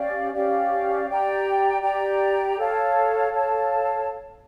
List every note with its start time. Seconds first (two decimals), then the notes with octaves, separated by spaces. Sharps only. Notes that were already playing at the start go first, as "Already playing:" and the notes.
Already playing: C#4 G4 D5 F5
0.32 C#4 G4 D5 F5
1.07 G4 D5 G5 A#5
1.82 G4 D5 G5 A#5
2.57 A4 C#5 F5 A5
3.31 A4 C#5 F5 A5